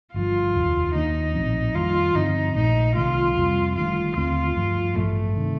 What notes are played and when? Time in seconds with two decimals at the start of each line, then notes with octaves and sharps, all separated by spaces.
0.14 G1 G2 F3 F4
0.54 F1 D#2 D#3
0.94 D#2 D#3 A#3 D4 D#4
1.35 A#1 A2 F3 C4
1.75 F2 D#3 G3 A#3 F4
2.15 G2 D3 F3 C4 D#4
2.55 A#1 A#2 A3 D#4
2.95 C2 C3 D#3 A3 F4
3.36 F2 C3 G3
3.75 G1 G2 D#3 A3 F4
4.16 D#2 D3 A3 C4 F4
4.55 G2 F3 A3
4.96 A1 G2 F3 A3
5.36 C3 D#3